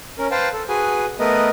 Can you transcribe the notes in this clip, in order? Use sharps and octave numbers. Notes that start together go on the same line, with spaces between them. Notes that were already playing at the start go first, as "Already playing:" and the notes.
C#4 A#4
B4 C5 F5 G5 A5
A4
F#4 G#4 B4 G#5
A3 B3 A#4 B4 D#5